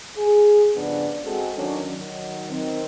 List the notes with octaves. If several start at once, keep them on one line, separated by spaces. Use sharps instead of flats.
G#4
G2 C#3 F3 B3 D4
G#3 C4 F#4 G#4 A4
D#3 F#3 C#4 D4
D#3 F#3
D#3 C4